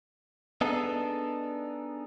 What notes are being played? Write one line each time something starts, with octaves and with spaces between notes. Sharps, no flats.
B3 D4 D#4 G#4 A4